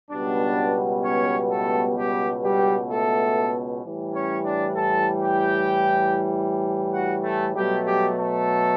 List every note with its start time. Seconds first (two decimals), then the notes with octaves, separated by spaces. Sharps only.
0.10 C#2 B2 G3 B3 D4
1.03 C#4 C#5
1.49 A3 A4
1.96 G3 G4
2.43 G3 G4
2.89 A3 A4
3.83 A2 E3 G3
4.14 C#4 C#5
4.44 D4 D5
4.76 A4 A5
5.22 G4 G5
6.93 F#4 F#5
7.24 A3 A4
7.54 B2 F#3 G3 A3 G4
7.86 G3 G4
8.17 A3 A4